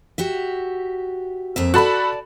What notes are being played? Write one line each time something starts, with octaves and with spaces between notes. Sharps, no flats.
F#4 G4 E5
F2 A#3 E5
F#4 A4 D5 A5 B5